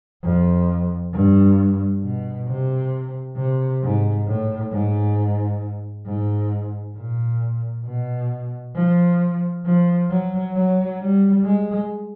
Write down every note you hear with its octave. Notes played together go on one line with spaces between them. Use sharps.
F2
G2
B2
C3
C3
G#2
A2
G#2
G#2
A#2
B2
F3
F3
F#3
F#3
G3
G#3